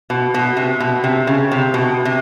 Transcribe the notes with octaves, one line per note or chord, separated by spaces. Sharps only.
B2
B2
C3
B2
C3
C#3
C3
B2
C3